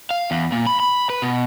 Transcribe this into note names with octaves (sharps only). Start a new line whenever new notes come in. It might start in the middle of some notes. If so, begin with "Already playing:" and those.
F5
E2
A#2
B5
B5
B4
B2